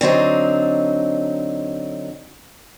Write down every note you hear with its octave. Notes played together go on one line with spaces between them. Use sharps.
D3 F#3 C4 D#4